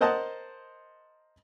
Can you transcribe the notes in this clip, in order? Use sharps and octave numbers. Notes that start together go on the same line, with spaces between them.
A#4 C5 D#5 F#5 A5